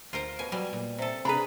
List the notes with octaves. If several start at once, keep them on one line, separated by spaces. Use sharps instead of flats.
D2 F4 A#4 C5
B2 G#5
B2 F#3 G3 G#5
A#2
C3 A4
C3 D4 G#4 B4 A#5 B5